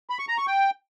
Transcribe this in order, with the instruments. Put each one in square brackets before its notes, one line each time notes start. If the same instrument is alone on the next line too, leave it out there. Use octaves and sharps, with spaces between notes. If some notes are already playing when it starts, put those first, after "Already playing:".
[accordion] B5
C#6
A#5
C#6
G5